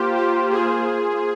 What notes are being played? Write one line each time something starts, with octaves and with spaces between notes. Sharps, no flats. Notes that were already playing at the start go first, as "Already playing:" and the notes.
Already playing: A#3 F4 G4 C5
G4
G#4